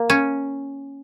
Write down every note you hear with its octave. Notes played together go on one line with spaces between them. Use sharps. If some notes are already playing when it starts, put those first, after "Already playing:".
Already playing: A#3
C#4